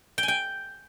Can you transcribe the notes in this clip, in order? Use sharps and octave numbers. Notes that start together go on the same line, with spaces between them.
G5
G#5
G5